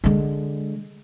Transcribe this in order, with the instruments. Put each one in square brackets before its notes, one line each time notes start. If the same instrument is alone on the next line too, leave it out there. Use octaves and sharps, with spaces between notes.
[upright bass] D3 G#3